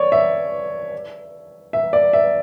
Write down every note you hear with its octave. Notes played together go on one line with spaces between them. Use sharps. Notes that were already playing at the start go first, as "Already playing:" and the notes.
Already playing: C#5 D5
E5
E5
D5
E5